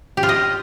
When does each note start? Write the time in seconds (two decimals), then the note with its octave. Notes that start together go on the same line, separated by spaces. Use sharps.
0.17 G4
0.23 F4
0.29 D#5